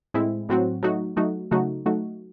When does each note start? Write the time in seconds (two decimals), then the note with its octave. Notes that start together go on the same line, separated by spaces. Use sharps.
0.14 A2 G#3 C4 E4
0.49 A2 F#3 C4 F#4
0.83 F#3 A3 D#4 F#4
1.17 F#3 A3 D#4 F#4
1.51 C#3 F#3 A3 D#4 F#4
1.86 F#3 A3 D#4 F#4